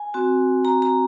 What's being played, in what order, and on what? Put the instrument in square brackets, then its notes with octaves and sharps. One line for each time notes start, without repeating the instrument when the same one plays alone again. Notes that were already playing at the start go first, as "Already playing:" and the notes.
Already playing: [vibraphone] G#5
C4 F#4
A#5
A#5